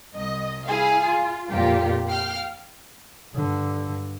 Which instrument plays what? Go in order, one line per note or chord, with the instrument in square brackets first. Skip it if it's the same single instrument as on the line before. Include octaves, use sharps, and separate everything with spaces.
[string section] C2 D#5
E4 G#4 F5
F4
F2 A#2 F4 G4
F5 G5 F6
[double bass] G2 D3